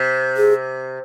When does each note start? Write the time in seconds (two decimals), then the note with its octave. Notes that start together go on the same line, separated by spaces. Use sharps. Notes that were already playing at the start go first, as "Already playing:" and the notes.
Already playing: C3
0.37 G#4